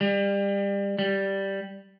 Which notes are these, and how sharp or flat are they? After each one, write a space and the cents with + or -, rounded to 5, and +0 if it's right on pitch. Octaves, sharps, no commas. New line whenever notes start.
G3 +25
G3 -5